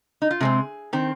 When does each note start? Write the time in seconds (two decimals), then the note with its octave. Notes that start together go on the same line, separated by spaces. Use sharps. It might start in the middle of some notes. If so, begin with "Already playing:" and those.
0.22 D#4
0.31 F4
0.41 C3 G#3 C4 G#4
0.93 D#3 C4